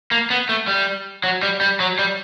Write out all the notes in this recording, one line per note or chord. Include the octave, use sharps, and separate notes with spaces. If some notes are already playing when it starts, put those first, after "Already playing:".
A#3
B3
A3
G3
F#3
G3
G3
F#3
G3